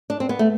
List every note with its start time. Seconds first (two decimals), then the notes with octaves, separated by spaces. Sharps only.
0.10 D4
0.20 C4
0.29 B3
0.39 A3